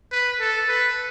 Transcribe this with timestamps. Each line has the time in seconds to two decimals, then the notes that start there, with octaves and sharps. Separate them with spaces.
0.12 B4
0.40 A4
0.68 B4